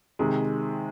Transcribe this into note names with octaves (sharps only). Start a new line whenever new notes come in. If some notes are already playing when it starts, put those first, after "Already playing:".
C3 D#3 G#3